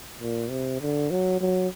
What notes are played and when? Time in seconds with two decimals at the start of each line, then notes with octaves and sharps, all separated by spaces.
0.21 A#2
0.50 C3
0.81 D3
1.11 F#3
1.41 F#3